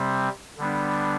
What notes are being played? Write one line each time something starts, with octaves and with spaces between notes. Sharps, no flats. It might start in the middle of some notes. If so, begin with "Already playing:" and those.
Already playing: C3 G3 C4
D3 G3 B3 D4